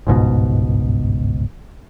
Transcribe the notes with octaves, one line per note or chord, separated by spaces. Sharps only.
G1 C#2 G#2 B2